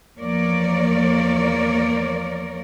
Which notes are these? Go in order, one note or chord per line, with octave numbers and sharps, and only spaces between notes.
E2 F3 A#3 A#4 C#5 D5